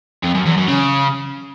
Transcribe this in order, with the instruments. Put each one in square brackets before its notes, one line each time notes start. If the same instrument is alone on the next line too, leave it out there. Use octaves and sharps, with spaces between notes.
[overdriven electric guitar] F2
F#2
E2
F#2
C#3